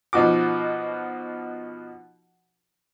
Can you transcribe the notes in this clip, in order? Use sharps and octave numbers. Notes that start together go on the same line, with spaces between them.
B2 F3 D#4 F#4 D6